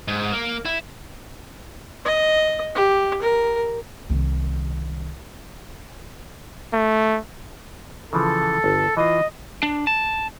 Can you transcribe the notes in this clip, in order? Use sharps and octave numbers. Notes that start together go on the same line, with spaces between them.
G#2
A#3
E4
D#5
G4
A#4
C2 D#3
A3
C#3 E3 F3 A4
G1
E3 F4 D#5
D4
A5